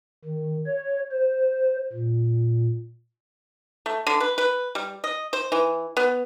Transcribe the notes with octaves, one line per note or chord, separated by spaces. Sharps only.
D#3
C#5
C5
A#2
A3
D3
B4
B4
G3
D#5
C5
E3
B3